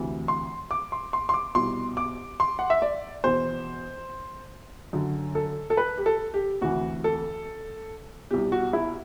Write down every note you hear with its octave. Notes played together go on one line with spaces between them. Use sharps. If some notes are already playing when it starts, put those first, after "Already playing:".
Already playing: D2 C3 E3
C6
D6
C6
C6
C6
D6
C2 B2 C6
D6
C6
F#5
E5
D5
E2 B2 C5
F#2 D3
A4
A4
B4
G4
A4
G4
D2 C3 E3 F#4
A4
C2 B2 G4
F#4
E4